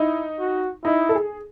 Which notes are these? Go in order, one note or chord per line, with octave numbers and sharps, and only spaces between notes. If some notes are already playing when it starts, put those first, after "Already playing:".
Already playing: D#4 E4
F#4
D#4 E4
A4
G#4